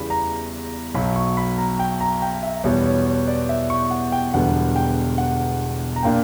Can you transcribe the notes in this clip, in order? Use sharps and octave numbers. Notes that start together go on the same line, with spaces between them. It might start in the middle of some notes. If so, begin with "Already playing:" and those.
Already playing: E2 C#3 G3 E4 B5
A#5
B1 B2 F#3 B5
C#6
B5
A#5
G5
A#5
G5
E5
E2 B2 G3 B3 C#5
C#5
C#5
D5
E5
C#6
F#5
G5
E1 E2 D3 G3 B3 F#5
G5
F#5
A#5
A#2 A#3 D4 G5